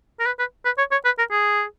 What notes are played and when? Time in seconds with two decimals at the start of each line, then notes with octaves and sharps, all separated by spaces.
0.20 A#4
0.26 B4
0.39 B4
0.65 B4
0.78 C#5
0.92 C#5
1.05 B4
1.18 A#4
1.31 G#4